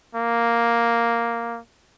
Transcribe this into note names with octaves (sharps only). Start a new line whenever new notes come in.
A#3